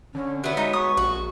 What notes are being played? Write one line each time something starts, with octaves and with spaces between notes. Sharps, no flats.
D3 C#4
F#3 B3 E5
G#3 D#4
C#6 D#6
A#1 F#4